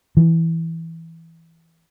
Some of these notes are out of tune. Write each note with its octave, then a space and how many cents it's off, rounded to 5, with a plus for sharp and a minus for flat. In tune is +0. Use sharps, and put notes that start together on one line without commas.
E3 -5